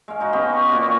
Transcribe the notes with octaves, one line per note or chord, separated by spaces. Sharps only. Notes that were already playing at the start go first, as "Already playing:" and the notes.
G#3 F5
D#4 F#4
B3 C#4 G4 D#5
C#6
A#2 B3 F4 F#4
D#3 B4